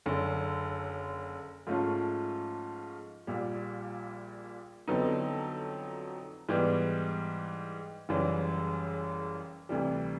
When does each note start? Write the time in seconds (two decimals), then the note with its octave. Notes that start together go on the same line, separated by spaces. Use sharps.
0.06 F#1 F#2 D3
1.67 G#2 F3 A3 C#4 F4
3.27 A#1 A#2 G3
4.88 F2 D3 F#3 B3 D#4
6.49 G#2 E3 G3 B3
8.09 F#1 F#2 C#3 E3 G3
9.69 D2 C3 E3 G3